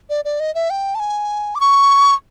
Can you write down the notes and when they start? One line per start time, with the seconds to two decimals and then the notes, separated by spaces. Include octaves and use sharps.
0.10 D5
0.25 D5
0.40 D#5
0.55 E5
0.70 G5
0.95 A5
1.00 G#5
1.55 D6
1.60 C#6